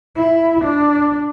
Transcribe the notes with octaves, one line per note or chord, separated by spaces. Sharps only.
E4
D4